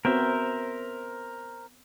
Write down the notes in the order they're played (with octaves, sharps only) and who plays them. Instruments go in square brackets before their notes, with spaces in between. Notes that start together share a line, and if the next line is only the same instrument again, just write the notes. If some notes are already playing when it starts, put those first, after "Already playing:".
[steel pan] B3 C4 F#4 [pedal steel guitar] A#4 C5 E5